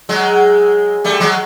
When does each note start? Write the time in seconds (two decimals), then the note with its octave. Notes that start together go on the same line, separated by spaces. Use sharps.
0.09 F#3 G#3
1.04 G3 A3
1.20 F#3 G#3